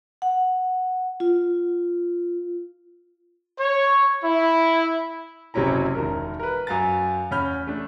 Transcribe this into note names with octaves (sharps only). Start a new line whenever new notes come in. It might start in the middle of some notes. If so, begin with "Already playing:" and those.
F#5
F4
C#5
E4
F#1 C3 F#3 C#4 E4 A#5
E1 D#3 A#4
A#4 B4
F#2 F5 A#5 A6
E2 C#4 B5 F6 G6
A3 D4